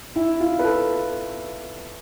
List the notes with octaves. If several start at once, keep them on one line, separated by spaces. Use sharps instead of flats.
E4
F4
B4
A4